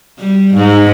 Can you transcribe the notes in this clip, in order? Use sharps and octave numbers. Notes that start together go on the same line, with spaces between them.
G3
G#2